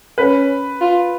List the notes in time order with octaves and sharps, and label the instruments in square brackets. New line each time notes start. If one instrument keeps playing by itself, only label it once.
[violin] C#4 [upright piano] B4
[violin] F4